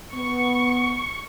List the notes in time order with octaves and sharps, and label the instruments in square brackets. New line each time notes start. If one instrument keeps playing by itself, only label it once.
[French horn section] B3 [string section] C#6